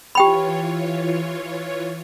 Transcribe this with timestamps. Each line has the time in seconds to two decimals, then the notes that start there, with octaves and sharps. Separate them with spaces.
0.15 E3 F4 G4 C#5 G5 B5